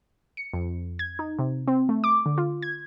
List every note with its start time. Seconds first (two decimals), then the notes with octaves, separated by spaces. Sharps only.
0.37 C#7
0.54 F2
0.99 G#6
1.19 D#4
1.39 C3
1.68 C4
1.89 A3
2.04 D6
2.26 D3
2.38 F4
2.63 G#6